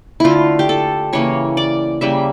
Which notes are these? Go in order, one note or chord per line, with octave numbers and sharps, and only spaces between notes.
D3 A3 E4 F4
G4
A4
C#3 E3 A#3 C#5
D5
C#3 G3 A#3 E5